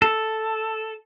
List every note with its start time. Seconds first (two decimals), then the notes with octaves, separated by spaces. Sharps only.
0.02 A4